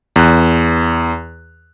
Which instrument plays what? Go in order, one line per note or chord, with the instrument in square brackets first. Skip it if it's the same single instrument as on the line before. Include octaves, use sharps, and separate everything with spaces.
[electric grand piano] E2 F#6